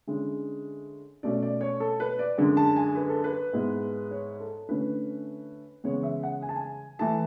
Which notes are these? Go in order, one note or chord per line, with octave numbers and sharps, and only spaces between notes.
D3 G#3 C#4 E4
B2 A3 C#4 D5
D5
C#5
A4
B4
D5
F#2 D3 G#3
A5
G#5
B4
A4
B4
G#2 G#3 B3 E4
C#5
A4
D3 A3 C#4 E4 B4
C#3 E3 G#3 B3 C#5
E5
F#5
G#5
A5
G#5
E3 A3 E4 A5